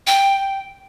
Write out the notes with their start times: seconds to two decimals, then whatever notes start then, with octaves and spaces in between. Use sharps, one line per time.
0.07 G5